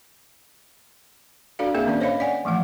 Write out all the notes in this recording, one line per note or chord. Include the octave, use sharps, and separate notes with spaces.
D4 F#4 A4 D5 F5
A#3 C4 G#4 A#4 E5 F5
D#3 A#3 C#4 D4 F#4 D5
C5 C#5 D#5 F5 B5
D5 F#5 G#5
E3 F3 A3 F#5